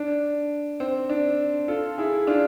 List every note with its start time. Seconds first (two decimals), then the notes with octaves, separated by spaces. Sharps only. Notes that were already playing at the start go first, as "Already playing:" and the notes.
Already playing: D4
0.80 C4
1.09 D4
1.68 F4 A4
1.98 E4 G#4
2.27 D4 F4